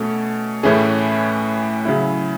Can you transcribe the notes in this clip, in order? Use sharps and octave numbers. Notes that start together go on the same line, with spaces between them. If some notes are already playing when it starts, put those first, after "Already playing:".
Already playing: B2 A3 C#4 A4
A2 E3 A3 C#4 G#4
C#3 F#3 C#4 E4